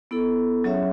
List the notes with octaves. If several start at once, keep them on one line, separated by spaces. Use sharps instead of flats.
B3 E4 A4
F#3 C#4 G#4 C#5 E5